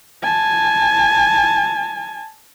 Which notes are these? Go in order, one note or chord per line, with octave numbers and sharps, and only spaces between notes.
G#5 A5